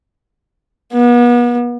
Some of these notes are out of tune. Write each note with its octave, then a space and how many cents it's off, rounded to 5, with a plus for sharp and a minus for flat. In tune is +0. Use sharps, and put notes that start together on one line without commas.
B3 -40